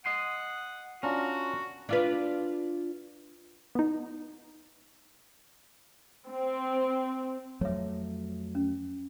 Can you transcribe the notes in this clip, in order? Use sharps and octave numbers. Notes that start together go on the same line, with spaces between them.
D#5 F#5 C6
C#4 D4 F4 F#4 A#4
D4 F4 B4
B3 D#4
C4
F2 F#3 A3 C#5 E5
C#4